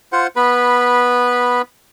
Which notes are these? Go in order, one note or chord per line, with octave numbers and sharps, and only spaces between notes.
F4 C5 F#5
B3 B4 B5